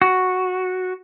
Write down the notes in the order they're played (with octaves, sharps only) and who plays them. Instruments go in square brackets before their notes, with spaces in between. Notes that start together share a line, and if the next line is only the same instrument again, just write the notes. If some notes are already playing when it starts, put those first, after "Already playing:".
[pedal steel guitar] F#4